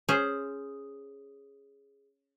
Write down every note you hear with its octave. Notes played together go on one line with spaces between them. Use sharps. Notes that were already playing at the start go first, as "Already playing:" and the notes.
C#4 G#4 C5